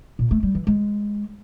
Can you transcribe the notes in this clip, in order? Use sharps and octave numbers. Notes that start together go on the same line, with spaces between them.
A#2
A3
G3
E3
G#3